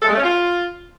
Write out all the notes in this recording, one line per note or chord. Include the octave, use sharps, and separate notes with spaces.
A4
G#3
A3
C#4
F4